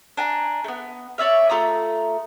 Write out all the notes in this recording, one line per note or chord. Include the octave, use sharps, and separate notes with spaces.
D4 G#5 A#5
A3 B3
C#5 D5 E5 F5
A3 F4 A#5 D#6